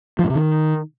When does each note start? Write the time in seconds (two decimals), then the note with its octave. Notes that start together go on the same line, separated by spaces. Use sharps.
0.19 F3
0.24 A2
0.30 C3
0.35 D#3